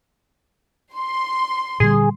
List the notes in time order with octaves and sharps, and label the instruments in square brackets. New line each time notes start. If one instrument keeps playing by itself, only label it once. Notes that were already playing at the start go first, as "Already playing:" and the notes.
[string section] C6
[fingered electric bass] A#2 D3 G3 [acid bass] G#4